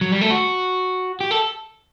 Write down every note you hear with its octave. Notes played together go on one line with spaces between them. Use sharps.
F#3
G3
A3
F#4
G4
A4